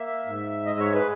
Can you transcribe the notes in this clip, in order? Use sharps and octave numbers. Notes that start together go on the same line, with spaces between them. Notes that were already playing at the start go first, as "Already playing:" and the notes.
Already playing: A#3 E5
G#2
G#3 D#5
C#5
B4